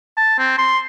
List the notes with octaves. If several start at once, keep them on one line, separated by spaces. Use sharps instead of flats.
A5
C4
C6